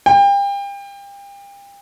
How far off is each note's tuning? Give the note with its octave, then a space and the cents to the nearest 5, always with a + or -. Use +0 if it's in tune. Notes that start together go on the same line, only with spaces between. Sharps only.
G5 +35